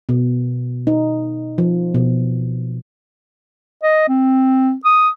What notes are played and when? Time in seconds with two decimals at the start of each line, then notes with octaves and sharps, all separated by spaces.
0.09 B2
0.87 D#4
1.58 F3
1.95 B2
3.83 D#5
4.08 C4
4.85 D#6